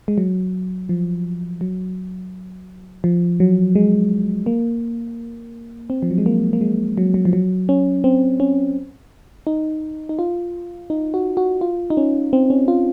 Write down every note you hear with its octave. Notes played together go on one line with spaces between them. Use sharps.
G#3
F#3
F3
F#3
F3
F#3
G#3
A#3
C4
F3
F#3
G#3
A#3
A#3
G#3
F#3
F#3
F3
F#3
C#4
C4
C#4
D#4
D#4
F4
D#4
F#4
F#4
F4
D#4
C#4
C4
C#4
F4